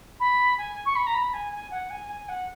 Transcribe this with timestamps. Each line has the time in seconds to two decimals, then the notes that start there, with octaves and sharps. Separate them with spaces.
0.20 B5
0.58 G#5
0.85 C#6
0.95 B5
1.06 A#5
1.14 B5
1.33 G#5
1.52 G#5
1.71 F#5
1.90 G#5
2.09 G#5
2.28 F#5